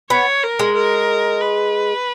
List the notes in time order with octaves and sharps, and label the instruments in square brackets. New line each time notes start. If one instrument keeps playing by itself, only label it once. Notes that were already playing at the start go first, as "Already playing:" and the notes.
[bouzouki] B3 [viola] C#5
[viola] A#4
[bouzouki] G#3
[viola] A#4
B4